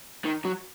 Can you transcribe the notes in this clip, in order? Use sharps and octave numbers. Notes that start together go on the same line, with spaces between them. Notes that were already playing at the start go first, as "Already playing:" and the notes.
D#3
F#3